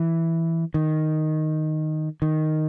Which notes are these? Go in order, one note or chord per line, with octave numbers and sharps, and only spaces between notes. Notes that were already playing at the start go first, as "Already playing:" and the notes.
Already playing: E3
D#3
D#3